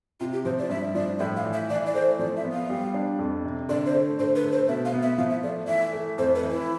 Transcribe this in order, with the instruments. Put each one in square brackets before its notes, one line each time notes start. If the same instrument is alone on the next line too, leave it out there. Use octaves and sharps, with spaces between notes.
[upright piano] C3 [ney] F4
[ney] G4
[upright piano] F3 [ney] C5
[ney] D5
[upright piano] G2 [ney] E5
[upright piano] F3 [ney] D5
[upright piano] A2 [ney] E5
[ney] F5
[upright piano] E3
[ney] E5
[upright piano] E3 [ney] D5
[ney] D5
[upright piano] A3 [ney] C5
[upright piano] F3 [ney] D5
[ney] E5
[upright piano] B3
[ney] F5
[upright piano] G3
D4
F2
C3
[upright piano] D3 [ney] D5
[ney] C5
[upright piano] A3
[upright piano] D3 [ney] C5
[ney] B4
[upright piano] A3
[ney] C5
[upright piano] B2 [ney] E5
[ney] F5
[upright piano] B3
[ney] E5
[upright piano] F3 [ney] F5
[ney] E5
[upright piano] A3 [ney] D5
[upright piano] E3 [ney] E5
[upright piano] A3
[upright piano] F2 [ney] C5
[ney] B4
[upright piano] E3
[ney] E4